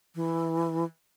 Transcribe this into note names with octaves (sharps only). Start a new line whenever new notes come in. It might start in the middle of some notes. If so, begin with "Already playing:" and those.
E3